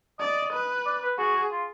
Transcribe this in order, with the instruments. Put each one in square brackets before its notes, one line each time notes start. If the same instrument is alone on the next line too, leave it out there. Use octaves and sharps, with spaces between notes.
[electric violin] D5 [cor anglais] D#5
[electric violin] B4
[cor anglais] D5
B4
[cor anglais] F#4 [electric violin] G#4
[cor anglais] F4